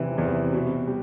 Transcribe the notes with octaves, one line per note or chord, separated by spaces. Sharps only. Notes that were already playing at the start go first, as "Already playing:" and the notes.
Already playing: E2 C3 E3
E2
B2
G3